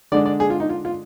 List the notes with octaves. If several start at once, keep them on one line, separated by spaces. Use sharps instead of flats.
D3 G#3 D4 D5
D5
G#4
F4
D#4
F4
F4